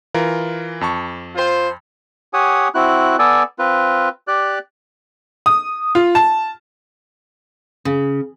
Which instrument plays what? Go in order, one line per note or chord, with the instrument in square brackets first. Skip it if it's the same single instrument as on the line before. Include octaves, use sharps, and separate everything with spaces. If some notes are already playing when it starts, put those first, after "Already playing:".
[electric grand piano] E3 F4 A#4
F2 A5 C#6
[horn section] F4 C5
[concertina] G4 C#5 F#5 G#5 D#6
C4 E4 F#4 F#6
B3 A4 D5 G#5
C4 F4 B4
G4 D5 F#6
[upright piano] D#6
F4
A5
[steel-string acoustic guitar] C#3